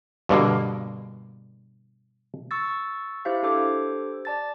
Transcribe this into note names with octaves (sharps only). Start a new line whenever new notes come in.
G2 B2 D3 A#3
C#6 E6 A6
E4 G4 C5 E5 F5
D4 G4 A4 C5 D6
D5 A5 A6